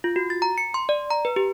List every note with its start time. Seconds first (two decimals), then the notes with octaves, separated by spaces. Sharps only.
0.04 F4
0.16 F#4
0.30 A6
0.42 A#5
0.58 C#7
0.74 C6
0.89 D5
1.10 A#5
1.25 B4
1.36 G4